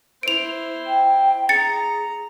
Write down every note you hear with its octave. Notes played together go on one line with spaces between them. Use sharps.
E4 C5 D7 F7
G5
G#4 A#5 A6 C#7